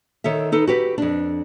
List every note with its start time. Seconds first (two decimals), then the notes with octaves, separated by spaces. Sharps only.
0.24 D#3 A4 C#5 E5
0.52 D#4 A4 B4
0.67 F#4 G4 B4
0.98 F2 D4